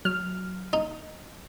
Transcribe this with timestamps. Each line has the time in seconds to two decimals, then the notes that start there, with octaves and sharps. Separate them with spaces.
0.05 F#3 F6
0.73 D#4